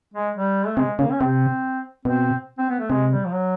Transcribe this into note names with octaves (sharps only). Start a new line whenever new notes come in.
G#3
G3
A3
C3 G#3
C#3 A#3
C#4
C3 C4
B2 C4
C4
B3
A3
C3 G#3
G3
F3
F#3